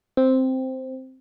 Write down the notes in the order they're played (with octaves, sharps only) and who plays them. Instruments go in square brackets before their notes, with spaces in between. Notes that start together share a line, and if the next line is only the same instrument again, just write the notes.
[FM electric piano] C4